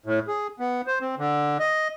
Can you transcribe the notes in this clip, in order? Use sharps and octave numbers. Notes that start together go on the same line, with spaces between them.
A2
G#4
B3
C5
C4
D3
D#5